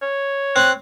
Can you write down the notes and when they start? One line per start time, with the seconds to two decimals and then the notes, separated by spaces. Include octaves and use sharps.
0.02 C#5
0.56 C4 F#6